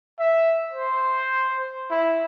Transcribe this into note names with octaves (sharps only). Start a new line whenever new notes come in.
E5
C5
E4